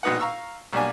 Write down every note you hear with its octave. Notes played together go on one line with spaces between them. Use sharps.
A#1 B2 D#4 B4 F#5
F5 A#5 C#6 E6
B1 G3 A#3 D4 G#5